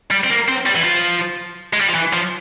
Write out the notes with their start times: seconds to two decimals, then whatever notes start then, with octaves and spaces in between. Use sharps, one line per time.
0.11 G3
0.24 C4
0.30 A#3
0.48 C4
0.66 G3
0.76 E3
0.84 F3
1.73 G#3
1.80 G3
1.88 F3
1.94 E3
2.13 F3